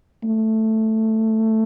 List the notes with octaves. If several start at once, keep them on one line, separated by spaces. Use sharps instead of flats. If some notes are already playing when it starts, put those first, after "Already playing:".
A3